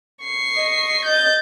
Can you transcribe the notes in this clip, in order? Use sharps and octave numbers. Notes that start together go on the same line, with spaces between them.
C#6 C7
D#5
G6 A6